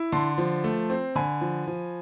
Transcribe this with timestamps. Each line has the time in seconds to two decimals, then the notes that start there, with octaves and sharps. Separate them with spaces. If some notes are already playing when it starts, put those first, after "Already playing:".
Already playing: E4
0.12 D3 A5 C6
0.38 F3
0.64 A3
0.90 C4
1.15 D3 G#5 B5
1.41 F3
1.68 F3